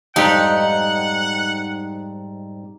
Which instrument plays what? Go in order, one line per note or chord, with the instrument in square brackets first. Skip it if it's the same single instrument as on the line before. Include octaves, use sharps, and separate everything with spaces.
[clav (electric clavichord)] F2 G4 [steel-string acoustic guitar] G#2 G3 [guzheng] D#4 [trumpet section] F#5